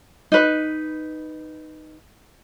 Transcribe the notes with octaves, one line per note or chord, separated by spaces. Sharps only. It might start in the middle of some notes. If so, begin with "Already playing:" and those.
D#4 B4